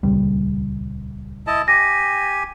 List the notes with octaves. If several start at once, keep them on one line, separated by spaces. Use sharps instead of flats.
D#1 C#2 G3
E4 D#5 A5
G4 G#5 A#6